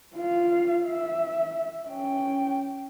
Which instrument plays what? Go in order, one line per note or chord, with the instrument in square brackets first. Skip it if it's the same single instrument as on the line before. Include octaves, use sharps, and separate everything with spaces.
[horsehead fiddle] F4 F5
E5
C#4 G5